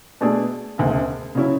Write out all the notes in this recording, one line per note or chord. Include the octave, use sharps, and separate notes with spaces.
B2 A3 D4 G#4
E1 D2 C#3
C#3 F#3 C#4 E4